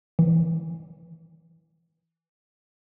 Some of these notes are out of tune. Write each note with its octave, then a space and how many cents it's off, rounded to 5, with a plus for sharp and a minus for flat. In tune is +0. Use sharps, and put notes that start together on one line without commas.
E3 +0